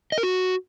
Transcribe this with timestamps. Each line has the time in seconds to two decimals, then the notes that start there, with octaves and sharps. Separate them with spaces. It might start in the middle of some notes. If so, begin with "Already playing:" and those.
0.12 D#5
0.18 A#4
0.23 F#4